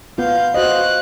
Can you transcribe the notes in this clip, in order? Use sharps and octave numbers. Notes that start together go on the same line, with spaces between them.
B3 F4 F5 G6
F#4 C5 D#5 F5 F#6